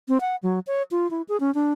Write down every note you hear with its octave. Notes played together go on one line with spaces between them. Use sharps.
C4
F#5
F#3
C#5
F4
E4
G#4
C#4
D4